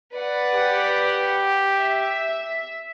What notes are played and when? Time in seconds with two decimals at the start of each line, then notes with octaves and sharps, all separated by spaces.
0.16 B4 D5 F#5
0.54 G4
1.73 E5